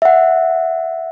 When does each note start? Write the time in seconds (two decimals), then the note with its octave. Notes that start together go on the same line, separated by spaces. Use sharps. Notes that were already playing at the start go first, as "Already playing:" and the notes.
0.02 E5 F#5